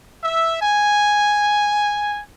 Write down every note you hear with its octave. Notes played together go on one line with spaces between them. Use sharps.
E5
G#5